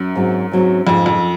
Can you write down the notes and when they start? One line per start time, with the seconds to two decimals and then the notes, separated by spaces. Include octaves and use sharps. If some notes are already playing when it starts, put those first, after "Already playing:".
Already playing: F#2
0.15 G#2 F#3 C4
0.52 G#2 F#3 C4
0.87 F2 G#2 F3 G#3
1.06 F2